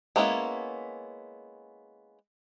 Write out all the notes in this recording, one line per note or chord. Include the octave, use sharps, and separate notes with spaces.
G#3 A#3 B3 C#4 E4